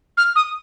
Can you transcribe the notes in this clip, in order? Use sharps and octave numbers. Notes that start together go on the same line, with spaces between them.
F6
D#6